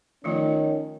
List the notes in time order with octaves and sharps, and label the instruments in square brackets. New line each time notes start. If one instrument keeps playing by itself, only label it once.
[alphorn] D#3 [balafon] F3 A3 F4 [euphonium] C#4